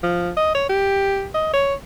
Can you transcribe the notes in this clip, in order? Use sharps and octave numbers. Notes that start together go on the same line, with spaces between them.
F3
D#5
C#5
G4
D#5
C#5